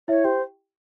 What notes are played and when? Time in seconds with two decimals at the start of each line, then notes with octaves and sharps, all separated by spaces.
0.08 E4 C#5 E5
0.24 G4 C5 G5